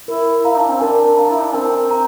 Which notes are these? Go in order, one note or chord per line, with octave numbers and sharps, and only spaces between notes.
E4 A#4
E4 F5 A#5
D4
C4
D4 A#4
F5 A#5
E4
D4
C4 A#4
A#5